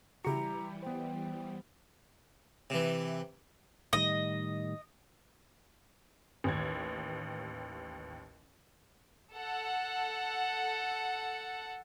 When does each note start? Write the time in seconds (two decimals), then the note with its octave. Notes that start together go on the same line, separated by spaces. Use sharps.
0.25 C#3 E3 G3 E4 F#4 G4 A#5 C#7
0.82 B3 C5 G5
2.70 C3 E3
3.93 A2 D#3 G3 D#5
6.44 A1 D#2 G#6
9.34 A4 F#5